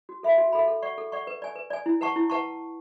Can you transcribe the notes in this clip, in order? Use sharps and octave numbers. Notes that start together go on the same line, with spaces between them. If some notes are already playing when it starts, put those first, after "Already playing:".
F#4
A4 E5 B5
F#4
A4 E5 B5
A4
D5 F#5 C#6
A4
D5 F#5 C#6
B4
D5 G#5
B4
D5 G#5
E4
B4 F#5 A5 C#6
E4
B4 F#5 A5 C#6